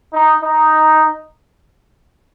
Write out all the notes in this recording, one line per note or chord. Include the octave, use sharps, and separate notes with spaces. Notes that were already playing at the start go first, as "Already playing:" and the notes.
D#4
D#4